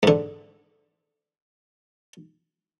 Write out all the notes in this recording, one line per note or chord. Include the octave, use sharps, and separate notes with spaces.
G#2 D3